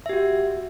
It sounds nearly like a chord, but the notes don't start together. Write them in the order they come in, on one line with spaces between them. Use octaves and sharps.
E5 G4 F#4